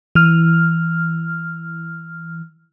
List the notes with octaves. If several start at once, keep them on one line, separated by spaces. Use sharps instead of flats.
E3 F6